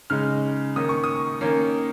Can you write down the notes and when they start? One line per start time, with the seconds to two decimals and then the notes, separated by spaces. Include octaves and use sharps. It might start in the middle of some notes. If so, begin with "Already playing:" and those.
0.10 C#3 G#3 D#4 F6
0.76 D#3 A#3 C#4 D#6
0.89 C#6
1.04 D#6
1.41 D#3 A#3 C#4